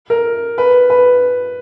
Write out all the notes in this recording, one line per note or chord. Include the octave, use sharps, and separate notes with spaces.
A#4
B4
B4